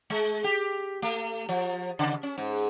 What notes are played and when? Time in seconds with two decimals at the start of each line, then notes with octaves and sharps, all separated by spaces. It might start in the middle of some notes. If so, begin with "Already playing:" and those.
0.10 G#3
0.44 G4
1.02 A3
1.49 F3
1.99 C#3
2.23 C#4
2.38 G#2